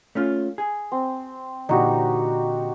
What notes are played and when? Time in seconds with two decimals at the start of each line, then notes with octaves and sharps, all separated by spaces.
0.15 A3 C#4 F4
0.58 G#4
0.92 C4
1.69 A#2 D3 E3 D#4 F#4 G4